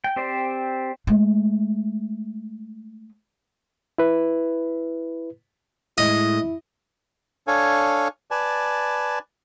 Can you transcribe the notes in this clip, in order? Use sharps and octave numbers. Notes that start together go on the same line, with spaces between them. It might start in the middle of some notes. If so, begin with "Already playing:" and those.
G5
C4 G4 C5 D5
G#3 A3
E4 B4
A2 G#3 E4 D#5
D4 A4 C#5 F5 G#5
B4 D5 G#5 A5